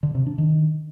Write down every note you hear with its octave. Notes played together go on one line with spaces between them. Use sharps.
D3
C3
D4
D#3